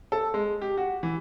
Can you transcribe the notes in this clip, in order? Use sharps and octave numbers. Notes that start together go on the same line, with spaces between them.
A4
G#3
G4
F#4
E3